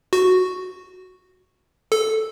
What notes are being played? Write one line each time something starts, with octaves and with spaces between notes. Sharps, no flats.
F#4
A4